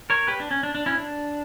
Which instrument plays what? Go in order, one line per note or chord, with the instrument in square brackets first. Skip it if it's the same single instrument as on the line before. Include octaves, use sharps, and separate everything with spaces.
[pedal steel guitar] A#4 C#5
G4 B4
D4
C#4
D4
D4
C#4 E4
D4